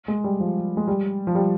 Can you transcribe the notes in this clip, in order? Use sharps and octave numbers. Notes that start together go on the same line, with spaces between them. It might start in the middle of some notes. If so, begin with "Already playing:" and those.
G#3
G3
F3
G#3
G3
F3
G3